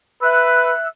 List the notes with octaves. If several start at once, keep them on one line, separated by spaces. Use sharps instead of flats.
B4 E5 E6 F#6